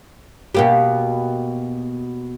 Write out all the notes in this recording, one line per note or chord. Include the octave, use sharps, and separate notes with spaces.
B2 A#3 G4